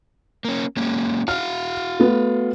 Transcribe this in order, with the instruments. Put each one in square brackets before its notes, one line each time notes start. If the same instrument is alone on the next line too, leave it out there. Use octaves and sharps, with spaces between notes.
[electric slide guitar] A#3 C#4
G#3 A#3 C#4
[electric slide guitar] F#4 F5 F#5 [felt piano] F6
[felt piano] A3 B3